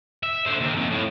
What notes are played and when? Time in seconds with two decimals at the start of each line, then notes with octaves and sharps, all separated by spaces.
0.23 E5
0.47 D3 C5
0.61 D#2
0.76 F2
0.91 A2